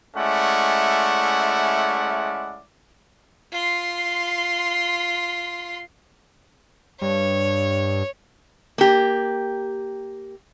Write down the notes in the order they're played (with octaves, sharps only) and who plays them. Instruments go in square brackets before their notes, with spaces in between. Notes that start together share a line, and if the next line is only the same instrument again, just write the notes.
[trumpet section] G#3 A3 C#4 E4 D5 F#5
[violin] F4 C6
[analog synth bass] G2 [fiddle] C#5
[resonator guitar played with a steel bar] A#3 G4